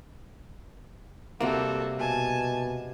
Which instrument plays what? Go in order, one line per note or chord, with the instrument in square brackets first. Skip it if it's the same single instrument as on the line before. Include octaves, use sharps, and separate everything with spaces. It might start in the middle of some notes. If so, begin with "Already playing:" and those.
[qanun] C3 G3 [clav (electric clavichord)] A#3 [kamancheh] F#4 A4
[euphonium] B2 [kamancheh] G#5 A5